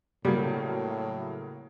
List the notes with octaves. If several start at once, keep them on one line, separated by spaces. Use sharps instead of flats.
A2 C#3 F#3 G3 A#3